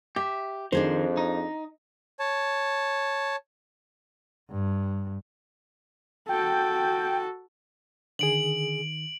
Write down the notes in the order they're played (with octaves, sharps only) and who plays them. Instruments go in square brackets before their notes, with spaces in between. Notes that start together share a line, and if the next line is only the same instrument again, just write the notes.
[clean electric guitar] G4 [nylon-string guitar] E5
[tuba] F2 [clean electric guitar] D#3 [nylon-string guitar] D4 G#4 C5
[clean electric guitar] D#4
[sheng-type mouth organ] C#5 A5
[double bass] G2
[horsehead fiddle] F#4 A4 [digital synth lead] G5
[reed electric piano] D3 G#4 [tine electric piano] D#3 [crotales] D7 F#7